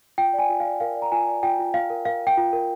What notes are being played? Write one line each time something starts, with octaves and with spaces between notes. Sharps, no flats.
F4 G5
D5
G#5
F4
F5
D5
A#4 F5
D5
A#5
F4 G#5
D5
F4 G5
F4
F4 F5
A#4
A#4 F5
A#4
G5
F4
A#4